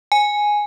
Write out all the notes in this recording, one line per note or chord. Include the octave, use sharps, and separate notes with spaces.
G#5